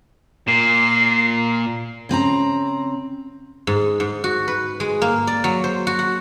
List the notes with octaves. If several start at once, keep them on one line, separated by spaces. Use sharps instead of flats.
A#2 C7
C#3 C4 D#5 A#5
G#2
G#2
F#4
B4
G#3
A#3
D5
F#3
C5
F#4
F#5